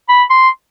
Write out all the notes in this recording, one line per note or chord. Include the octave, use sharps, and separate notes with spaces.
B5
C6